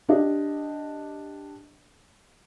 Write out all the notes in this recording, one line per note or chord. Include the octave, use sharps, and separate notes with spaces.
D4 G4 D#5